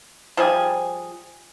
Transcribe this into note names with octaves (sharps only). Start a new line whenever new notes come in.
F3 G3 G#4